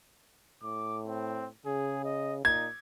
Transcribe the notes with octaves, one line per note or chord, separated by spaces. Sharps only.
A2 D6
C4
C#3 G#4
D#5
A#2 D#4 G#6